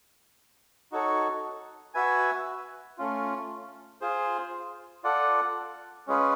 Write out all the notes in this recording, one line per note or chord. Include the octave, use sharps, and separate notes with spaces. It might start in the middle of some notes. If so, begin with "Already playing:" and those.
D#4 F#4 A4 C#5
F#4 B4 E5 G#5
A3 C#4 F4
F4 G#4 C5
F4 A4 D5 F#5
G#3 C#4 F4 G#4 B4